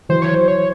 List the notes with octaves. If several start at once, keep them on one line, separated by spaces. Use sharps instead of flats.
E3 F#3 C5
C#5
C5
C#5